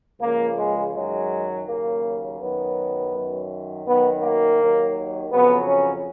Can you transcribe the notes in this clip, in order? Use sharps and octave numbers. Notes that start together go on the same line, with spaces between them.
C#2 C#3 F3 A#3
G#3
F#2 D#3 F#3 G#3
D#2 C#3 F#3 A#3
F#2 D#3 F#3 B3
F#2 D#3 F#3
F#2 D#3 F#3 B3
A#3
D#2 D#3 F#3
F2 C#3 F#3 B3
C#4